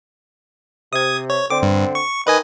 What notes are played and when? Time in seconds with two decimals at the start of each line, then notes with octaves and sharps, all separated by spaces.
0.93 C3 D#6 G#6
1.30 C#5
1.50 D3 C4 D6
1.62 G2
1.95 C#6
2.27 D#3 B4 D#5 G#5